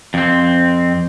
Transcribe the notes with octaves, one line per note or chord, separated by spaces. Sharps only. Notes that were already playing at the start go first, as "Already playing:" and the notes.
F2 C4